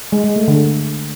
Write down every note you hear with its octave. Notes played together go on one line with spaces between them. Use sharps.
G#3
G#3
A3
D3